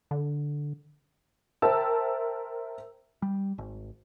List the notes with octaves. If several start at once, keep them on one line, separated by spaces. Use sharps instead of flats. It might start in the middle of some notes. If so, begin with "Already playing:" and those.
D3
A#4 C5 E5 G5 A5 E6
G3
G#1